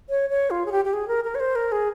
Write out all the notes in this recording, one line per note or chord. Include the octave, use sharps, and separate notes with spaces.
C#5
C#5
F4
G#4
G4
G4
G#4
A#4
A#4
C#5
C5
A#4
G#4